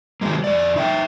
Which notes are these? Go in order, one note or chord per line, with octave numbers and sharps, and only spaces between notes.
D#3 F3 F#3 G#3 A#3
F2 D5
D#4 E5 F5 G5